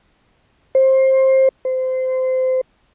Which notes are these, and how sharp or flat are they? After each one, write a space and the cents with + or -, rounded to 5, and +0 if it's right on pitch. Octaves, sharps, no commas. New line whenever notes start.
C5 +20
C5 -20